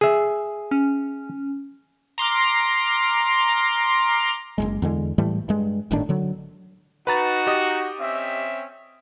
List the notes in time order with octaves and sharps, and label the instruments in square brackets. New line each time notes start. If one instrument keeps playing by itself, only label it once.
[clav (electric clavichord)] G#4 E5
[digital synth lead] C#4
[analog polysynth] A#5 C6 D6 F6
[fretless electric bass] F#1 D#2 G#3
E2 D3 G#3
A2 E3 G3 A3
G2 G#3
G1 A2 D#3 D4
D3 F#3
[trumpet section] D#4 F#4 [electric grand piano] B4 A#5 A6
[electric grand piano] G4 D#5 D#6
[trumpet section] C4 C#4 E5